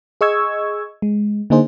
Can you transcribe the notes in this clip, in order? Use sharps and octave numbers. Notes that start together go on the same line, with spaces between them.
G#4 D#5 C#6 E6 G#6
G#3
D3 A#3 D#4 G#4 C5